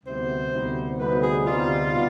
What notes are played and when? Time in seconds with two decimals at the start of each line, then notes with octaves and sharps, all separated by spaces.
0.04 D2 C3 G3 B3 D#4 C5
0.51 D2 C3 G3 B3 D#4
0.98 D2 C3 G3 B3 D#4 B4
1.21 G#4
1.45 D2 C3 G3 B3 D#4 F4
1.92 B2 G3 B3 D4